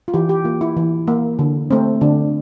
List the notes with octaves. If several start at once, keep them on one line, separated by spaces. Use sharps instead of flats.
F4
E3 G4
G4
A#3 F4
E4
E3
A#3
D3
A3 C4
D3 D4